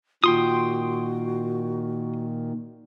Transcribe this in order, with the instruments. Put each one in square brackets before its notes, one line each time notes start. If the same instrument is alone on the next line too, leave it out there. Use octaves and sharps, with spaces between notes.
[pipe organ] A#2 D#3 [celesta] F4 [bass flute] F#4 [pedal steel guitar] G5 C6 D#6